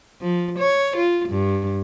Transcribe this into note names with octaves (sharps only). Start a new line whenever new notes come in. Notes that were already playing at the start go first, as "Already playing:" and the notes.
F3
C#5
F4
G2